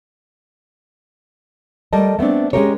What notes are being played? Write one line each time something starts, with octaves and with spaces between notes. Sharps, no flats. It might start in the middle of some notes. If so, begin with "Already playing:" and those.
G3 A3 A#4 D#5 A5
A3 B3 C4 D4
G#3 C#4 D4 G4 A#4 C#5